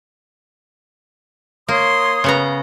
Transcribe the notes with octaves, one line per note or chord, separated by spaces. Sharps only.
A#3 C#5 C6 D#6
C#3 B3 A#5